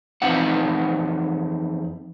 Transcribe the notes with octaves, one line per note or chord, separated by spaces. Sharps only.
F2 E3 C4 D#4 F#5